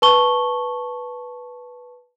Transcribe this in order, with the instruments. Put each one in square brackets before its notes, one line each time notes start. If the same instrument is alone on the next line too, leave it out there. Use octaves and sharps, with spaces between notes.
[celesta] B4 A5 C#6 G7